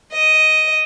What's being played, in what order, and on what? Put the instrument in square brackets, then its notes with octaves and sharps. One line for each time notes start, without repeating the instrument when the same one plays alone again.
[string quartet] D#5